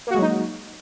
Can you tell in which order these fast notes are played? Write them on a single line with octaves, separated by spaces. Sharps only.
A#3 F#4 G#3 F#3 D#4